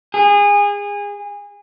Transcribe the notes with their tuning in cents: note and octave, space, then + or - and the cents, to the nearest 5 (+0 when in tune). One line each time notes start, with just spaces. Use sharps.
G#4 -25